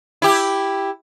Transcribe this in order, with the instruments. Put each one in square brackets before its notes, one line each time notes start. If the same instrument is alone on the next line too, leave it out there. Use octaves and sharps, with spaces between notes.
[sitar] E4 G4